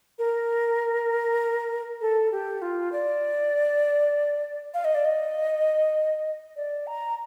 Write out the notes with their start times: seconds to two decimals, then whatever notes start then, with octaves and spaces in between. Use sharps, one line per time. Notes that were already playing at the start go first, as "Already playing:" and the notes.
0.19 A#4
2.01 A4
2.32 G4
2.62 F4
2.92 D5
4.74 F5
4.85 D#5
4.95 D5
5.05 D#5
6.56 D5
6.87 A#5